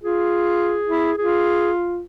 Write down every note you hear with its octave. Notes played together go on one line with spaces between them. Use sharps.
F4 G#4
E4
F4 G#4